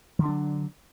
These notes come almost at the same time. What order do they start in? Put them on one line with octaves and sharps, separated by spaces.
F3 D3 D4 F#3